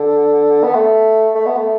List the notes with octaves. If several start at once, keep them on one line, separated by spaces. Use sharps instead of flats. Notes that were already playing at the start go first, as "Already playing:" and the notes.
Already playing: D3
B3
A3
A3
B3
A3